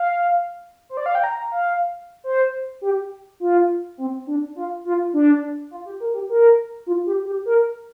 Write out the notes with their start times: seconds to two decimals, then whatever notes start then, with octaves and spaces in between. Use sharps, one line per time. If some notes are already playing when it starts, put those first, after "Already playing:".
Already playing: F5
0.89 C5
0.97 D5
1.06 F5
1.15 G5
1.24 A#5
1.38 A#5
1.52 F5
2.24 C5
2.82 G4
3.40 F4
3.98 C4
4.27 D4
4.56 F4
4.85 F4
5.13 D4
5.71 F4
5.86 G4
6.00 A#4
6.14 G4
6.30 A#4
6.87 F4
7.06 G4
7.26 G4
7.45 A#4